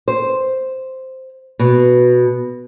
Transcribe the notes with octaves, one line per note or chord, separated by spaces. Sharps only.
C5
B2